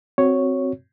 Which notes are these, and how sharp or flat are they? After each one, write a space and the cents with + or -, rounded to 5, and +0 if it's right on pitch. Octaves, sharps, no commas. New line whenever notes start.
C4 +0 F#4 +0 C#5 +0